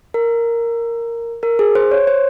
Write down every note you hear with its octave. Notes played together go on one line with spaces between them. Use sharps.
A#4
A#4
G#4
C5
C#5
C5